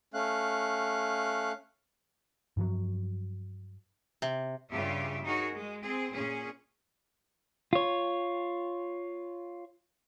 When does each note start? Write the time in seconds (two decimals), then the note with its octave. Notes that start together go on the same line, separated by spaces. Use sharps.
0.14 A3 C#4 F5 F#6
2.57 G2 F3 F#3
4.22 C3
4.72 G2 C#3 F4 G4 E5
5.24 D#4 F#4 G#4 A#4 C#5
5.55 G#3
5.84 C4 G#4
6.14 A#2 C#4 G#4
7.73 F4 C#5